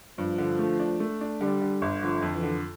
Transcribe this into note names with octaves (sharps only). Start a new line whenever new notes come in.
G2 F3
D3
A3
D4
A3
D4
D3 G3
D3
G1
D3 F3
F2
E3
D3